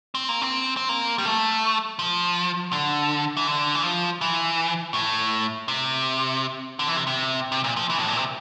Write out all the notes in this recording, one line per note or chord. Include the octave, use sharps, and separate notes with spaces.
C4
A#3
C4
C4
A#3
G3
A3
F3
D3
E3
D3
E3
F3
E3
A2
C3
D3
E3
C3
C3
C3
A#2
F3
E3
A2
A#2
C3